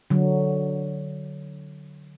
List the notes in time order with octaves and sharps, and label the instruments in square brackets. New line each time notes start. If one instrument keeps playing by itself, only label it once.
[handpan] D3 F#3